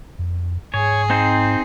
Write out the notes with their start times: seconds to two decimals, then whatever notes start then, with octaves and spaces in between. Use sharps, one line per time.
0.19 F2
0.74 G#2 G#4 C#5
1.10 C4 D#4 C5